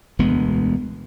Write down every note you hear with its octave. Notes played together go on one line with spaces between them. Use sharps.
E1 D2 G#3 B3